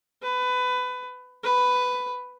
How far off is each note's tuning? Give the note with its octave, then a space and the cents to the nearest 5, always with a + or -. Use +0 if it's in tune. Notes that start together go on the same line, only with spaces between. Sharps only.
B4 +20
B4 +10